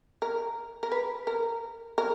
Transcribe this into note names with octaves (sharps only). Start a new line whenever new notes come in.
A#4
A#4
B4
A#4
A#4